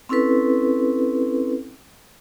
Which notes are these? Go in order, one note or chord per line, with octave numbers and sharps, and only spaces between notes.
C4 C#4 E4 A4 B4